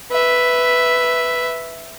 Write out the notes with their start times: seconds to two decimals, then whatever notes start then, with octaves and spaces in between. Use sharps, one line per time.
0.11 B4 E5